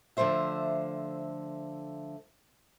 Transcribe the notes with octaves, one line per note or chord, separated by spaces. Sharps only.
D3 F3 A3 C4 C5 E5